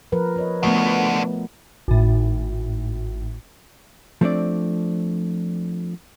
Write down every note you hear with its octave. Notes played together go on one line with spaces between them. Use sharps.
F3 A#4 B4
B4 C#5 D#5
F3 A3 B3 D4 F#4
G#1 A2
F3 A3 C4 D4 D5